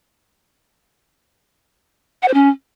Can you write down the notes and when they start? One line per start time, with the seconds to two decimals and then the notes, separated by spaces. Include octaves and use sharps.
2.22 F#5
2.28 C5
2.34 C#4